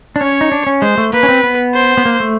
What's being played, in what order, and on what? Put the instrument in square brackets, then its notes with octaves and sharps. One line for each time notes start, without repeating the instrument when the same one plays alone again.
[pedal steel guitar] D4
[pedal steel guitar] C#4 [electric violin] C#5
[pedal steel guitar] D#4
D4
C#4
[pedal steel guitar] G#3 [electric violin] C5
[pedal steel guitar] A3
[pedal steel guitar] A#3 [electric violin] B4
[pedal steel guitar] C#4
C4
B3
[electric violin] C5
[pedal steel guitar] B3
A#3
A3